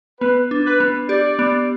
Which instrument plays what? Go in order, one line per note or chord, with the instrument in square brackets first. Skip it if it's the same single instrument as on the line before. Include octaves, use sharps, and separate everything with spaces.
[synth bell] B3 [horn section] B4
[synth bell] D4
[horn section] B4
[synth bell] B3
[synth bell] G4 [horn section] D5
[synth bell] B3